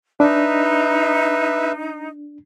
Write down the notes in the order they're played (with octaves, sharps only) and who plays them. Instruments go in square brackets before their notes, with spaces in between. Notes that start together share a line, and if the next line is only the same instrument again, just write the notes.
[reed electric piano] D4 [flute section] D#4 [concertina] B4 E5